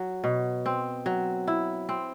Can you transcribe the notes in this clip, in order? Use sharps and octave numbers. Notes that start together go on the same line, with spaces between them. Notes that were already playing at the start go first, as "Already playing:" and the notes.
Already playing: F#3
B2
C4
F#3
E4
C4